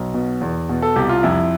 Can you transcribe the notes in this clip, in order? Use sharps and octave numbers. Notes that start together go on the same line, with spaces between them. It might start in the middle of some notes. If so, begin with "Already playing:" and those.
Already playing: B1
B2
E2
B2
A4
C2 G4
F4
F2 E4